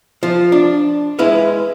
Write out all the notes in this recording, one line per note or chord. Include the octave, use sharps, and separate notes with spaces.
F3
D4
G#3 E4 B4 F5